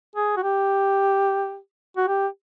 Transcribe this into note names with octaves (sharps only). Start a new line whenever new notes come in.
G#4
F#4
G4
F#4
G4